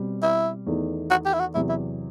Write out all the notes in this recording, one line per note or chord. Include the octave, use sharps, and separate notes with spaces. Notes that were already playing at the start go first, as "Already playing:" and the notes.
Already playing: B2 G3 C4
E4
E2 D#3 A3 D#4
F#4
G4
E4
F#4
E2 C3 F#3 E4
E4